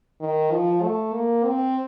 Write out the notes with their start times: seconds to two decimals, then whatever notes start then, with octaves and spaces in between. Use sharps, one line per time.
0.21 D#3
0.52 F3
0.83 A3
1.14 A#3
1.45 C4